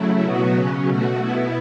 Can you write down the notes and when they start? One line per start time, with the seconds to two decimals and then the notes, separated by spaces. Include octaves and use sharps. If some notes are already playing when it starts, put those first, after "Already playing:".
Already playing: C#3 F#3 A3 E4
0.24 B2 F#3 B3 F#4
0.55 C#3 F#3 C#4
0.87 B2 A3 F#4
1.19 B2 B3 E4